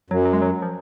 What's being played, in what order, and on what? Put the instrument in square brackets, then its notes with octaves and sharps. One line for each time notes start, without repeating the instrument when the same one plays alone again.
[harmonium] F#2 [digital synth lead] F#3
[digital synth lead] F#3
G#3
F#3
F3